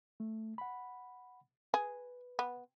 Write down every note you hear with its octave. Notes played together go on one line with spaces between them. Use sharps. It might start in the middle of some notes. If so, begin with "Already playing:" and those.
A3
F#5 B5
G#4 B4
B3